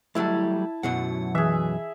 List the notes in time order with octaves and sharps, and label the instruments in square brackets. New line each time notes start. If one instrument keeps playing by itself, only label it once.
[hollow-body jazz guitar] F#3 G3 A3 [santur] E4 A5
[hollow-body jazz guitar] F#2 B2 F#3 [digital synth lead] F#5
[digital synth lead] E3 [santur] G#4 E5